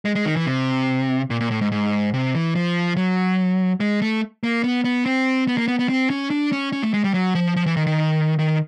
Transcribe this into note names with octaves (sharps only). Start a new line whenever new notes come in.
G#3
G#3
D#3
E3
C3
A#2
A#2
A2
G#2
G#2
C3
E3
F3
F#3
G#3
A3
A#3
B3
B3
C4
B3
A#3
B3
B3
C4
C#4
D4
C#4
C#4
A3
G#3
G3
F#3
F3
F3
E3
D#3
D#3
D#3